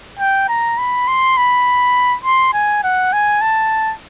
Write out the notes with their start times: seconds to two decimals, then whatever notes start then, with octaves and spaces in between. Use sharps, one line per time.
0.19 G5
0.49 A#5
0.78 B5
1.07 C6
1.37 B5
2.25 C6
2.54 G#5
2.84 F#5
3.13 G#5
3.41 A5